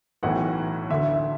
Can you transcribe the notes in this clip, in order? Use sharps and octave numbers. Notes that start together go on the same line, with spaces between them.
B1 A2 E3 F#5
D2 D3 E5
E5